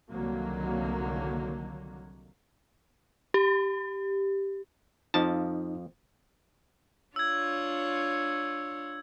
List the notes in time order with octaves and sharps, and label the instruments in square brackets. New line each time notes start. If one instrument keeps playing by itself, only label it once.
[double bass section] C2 D3 D#3 F#3 A#3
[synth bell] G4
[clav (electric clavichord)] F2 F3 A5 [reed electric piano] D#4
[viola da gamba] D4 F4 C#5 [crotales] E6 G#6